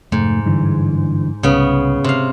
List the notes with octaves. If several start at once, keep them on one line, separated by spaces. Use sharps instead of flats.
F1 G#2 A3
G2 D3 E3
C2 C#3 B3
C3 F5